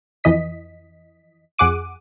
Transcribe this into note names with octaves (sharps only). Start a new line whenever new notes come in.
F2 E3 D#5 B6
F2 G#4 F#5 D6 D#7